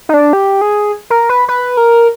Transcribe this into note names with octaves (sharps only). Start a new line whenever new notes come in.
D#4
D4
G4
G#4
A#4
B4
B4
A#4